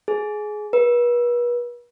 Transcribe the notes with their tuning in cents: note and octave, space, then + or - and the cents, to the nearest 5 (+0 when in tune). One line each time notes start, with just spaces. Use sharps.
G#4 +20
B4 -40